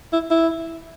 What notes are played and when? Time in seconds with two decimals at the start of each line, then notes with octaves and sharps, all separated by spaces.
0.13 E4
0.31 E4